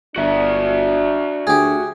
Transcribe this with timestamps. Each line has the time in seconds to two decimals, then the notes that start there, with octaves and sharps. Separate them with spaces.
0.16 G1 D4 F#4 E5
1.47 D2 G4 G#4